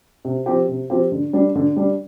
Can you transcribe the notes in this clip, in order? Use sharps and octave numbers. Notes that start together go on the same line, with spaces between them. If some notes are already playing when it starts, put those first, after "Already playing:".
C3
F3 C4 G4
C3
F3 C4 G4
D3
G3 D4
D3
G3 D4